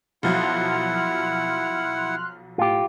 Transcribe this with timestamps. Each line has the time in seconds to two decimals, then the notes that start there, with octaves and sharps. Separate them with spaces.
0.23 B1 F3 F#3 E4 F#5 C6 F6 F#6
2.58 A2 F4 G4